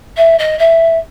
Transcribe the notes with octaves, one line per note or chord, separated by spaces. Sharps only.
E5
D#5
E5